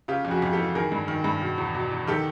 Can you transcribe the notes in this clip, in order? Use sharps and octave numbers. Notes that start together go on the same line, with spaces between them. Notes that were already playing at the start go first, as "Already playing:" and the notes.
C#3 F4 G4
F2
F#4 G#4
F2
G4 A4
E3
D#3 G#4 A#4
G2
D#3
G2
B2
E2
B2
E2
D#3 G4 A4